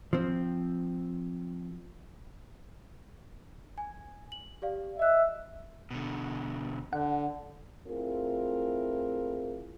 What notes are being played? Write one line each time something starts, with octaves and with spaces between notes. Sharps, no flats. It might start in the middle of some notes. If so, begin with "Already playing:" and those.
F3 C4
G#5
F#7
G4 D5 F5
D#5 E5 F#6
B2 D3
D3 F#5
A3 C4 E4 F4 G#4 A#4